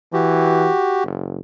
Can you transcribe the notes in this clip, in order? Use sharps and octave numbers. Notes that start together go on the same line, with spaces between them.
E3 F#4 G4
F#1